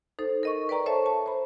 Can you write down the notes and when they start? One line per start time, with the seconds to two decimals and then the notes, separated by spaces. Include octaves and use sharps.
0.19 D#4 A4 C5
0.43 A#4 D#5 C#6
0.69 B4 D5 G5 A#5 C#6
0.86 A4 C5 C#5 E5 A5 C#6
1.06 A5
1.26 C5 B5